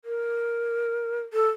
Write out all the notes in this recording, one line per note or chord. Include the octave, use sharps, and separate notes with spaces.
A#4
A4